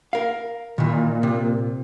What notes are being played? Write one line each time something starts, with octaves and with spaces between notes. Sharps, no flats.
A#4 F5
A#2 D#3 E3
C3